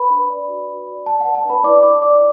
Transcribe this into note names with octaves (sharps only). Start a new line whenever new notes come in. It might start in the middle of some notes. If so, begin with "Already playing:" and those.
Already playing: B4 B5
D4
D5
F#4
F#4
D5
D5 A5
B4 F#5
A5
D4 B4 B5
E4 D5 D6
E4 D5 D6
D5 D6